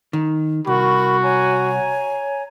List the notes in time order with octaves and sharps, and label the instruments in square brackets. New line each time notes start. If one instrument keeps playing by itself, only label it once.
[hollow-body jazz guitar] D#3
[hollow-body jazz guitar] C2 [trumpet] F#4 [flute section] A#4 B5 C#6
[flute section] C#5 G#5 A#5